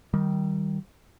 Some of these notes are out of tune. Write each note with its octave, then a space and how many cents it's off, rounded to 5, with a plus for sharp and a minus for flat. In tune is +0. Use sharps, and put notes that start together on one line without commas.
D#3 +0 G3 -20